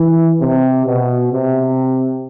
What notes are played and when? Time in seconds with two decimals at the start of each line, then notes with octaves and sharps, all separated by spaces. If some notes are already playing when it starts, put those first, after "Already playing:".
Already playing: E3
0.41 C3
0.86 B2
1.32 C3